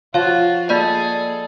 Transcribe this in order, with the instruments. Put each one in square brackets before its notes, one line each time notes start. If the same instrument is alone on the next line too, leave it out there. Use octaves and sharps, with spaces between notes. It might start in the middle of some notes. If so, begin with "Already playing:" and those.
[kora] F3 [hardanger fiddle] F4 F#4 [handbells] C#5 F5
[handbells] A#3 D5 D#5 [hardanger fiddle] G#4 A4